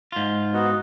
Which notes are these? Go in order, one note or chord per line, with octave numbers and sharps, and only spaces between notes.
G#2 F4
B3 D#4 F#4